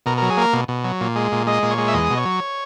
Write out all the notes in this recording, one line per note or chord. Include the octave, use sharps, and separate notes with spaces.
B2 A#4
F#3 A#4
G#4
A#3 A#4
B2
B2
F#3
A#2
G#3
A#2
G#3 D#5
A#2
C#5
G#3
E5
E2 D#5
B2
C#5
F#3